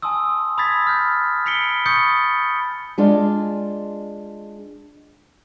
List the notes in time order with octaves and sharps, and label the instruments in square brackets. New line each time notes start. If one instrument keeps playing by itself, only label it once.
[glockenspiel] G#5 A5 C6 D#6 E6
B5 D#6 E6 G#6 A6 B6
F6 G6
B5 B6 C#7 D7 G7
B5 C#6 D#6 G6 A6 C#7
[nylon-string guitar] G#3 D4 F4